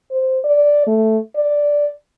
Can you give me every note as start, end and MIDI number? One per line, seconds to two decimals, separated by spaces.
0.11 0.39 72
0.44 0.86 74
0.87 1.18 57
1.36 1.89 74